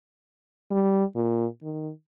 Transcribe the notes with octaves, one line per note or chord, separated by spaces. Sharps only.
G3
A#2
D#3